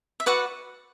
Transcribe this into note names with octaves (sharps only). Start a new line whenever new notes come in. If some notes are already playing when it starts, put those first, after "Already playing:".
E5
F#4 B4 D5 F#5